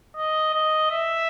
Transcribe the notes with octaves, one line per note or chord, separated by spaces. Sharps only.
D#5
D#5
E5